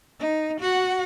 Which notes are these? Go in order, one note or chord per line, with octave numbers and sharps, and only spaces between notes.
D#4
F#4 F#5